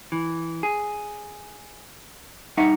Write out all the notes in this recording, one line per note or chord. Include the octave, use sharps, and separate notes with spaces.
E3
G#4
G2 D#4 E5 F#5